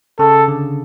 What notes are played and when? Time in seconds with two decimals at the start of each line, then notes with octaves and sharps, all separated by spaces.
0.19 C#3 A4
0.48 D3